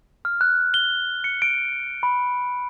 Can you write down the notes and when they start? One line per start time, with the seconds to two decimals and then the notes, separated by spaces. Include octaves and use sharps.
0.25 F6
0.41 F#6
0.74 G7
1.24 C#7
1.42 D7
2.03 B5